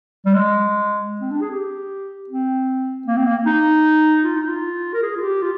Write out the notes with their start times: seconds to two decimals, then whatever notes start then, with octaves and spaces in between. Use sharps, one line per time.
0.26 G3
0.34 G#3
1.21 C4
1.31 D4
1.41 G#4
1.51 G4
2.29 C4
3.07 A#3
3.17 C4
3.27 A#3
3.46 D#4
4.24 F4
4.36 D#4
4.49 F4
4.94 A#4
5.02 G#4
5.17 F4
5.23 G4
5.42 F4